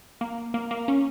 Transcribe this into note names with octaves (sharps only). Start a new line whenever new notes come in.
A#3
A#3
A#3
C#4